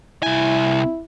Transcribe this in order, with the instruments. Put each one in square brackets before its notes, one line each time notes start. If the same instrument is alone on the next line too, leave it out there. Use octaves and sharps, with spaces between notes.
[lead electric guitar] C2 G#5 [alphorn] E4